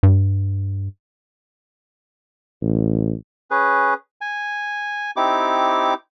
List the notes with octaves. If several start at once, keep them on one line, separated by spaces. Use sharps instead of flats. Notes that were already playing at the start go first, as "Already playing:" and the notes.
G2
A1
C#4 G#4 B4
G#5
C4 D#4 E4 G4 D6